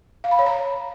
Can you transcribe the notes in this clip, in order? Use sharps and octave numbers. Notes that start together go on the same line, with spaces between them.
F5
B5
C#5
A#5